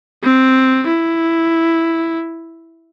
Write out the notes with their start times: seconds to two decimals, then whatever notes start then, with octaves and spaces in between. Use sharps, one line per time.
0.23 C4
0.87 E4